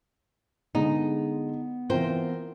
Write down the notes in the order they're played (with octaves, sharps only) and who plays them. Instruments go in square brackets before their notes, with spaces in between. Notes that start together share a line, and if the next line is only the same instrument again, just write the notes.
[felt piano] D3 G#3 G#4 [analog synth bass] B3 [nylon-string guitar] D#4
[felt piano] E3 C4 F4 [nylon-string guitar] A#4 C5 G5